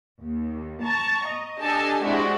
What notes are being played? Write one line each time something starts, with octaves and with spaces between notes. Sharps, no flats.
D#2
A5 A#5 C#6
D#5
D4 G4 A4 D#5 G#5 A5
G#3 C4 D4 E4 F#4 G4